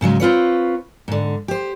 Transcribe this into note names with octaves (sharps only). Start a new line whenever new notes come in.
G#2 C#3 F#3 G#3
C4 F4 B4 C#5
G#2 D3
G4 C5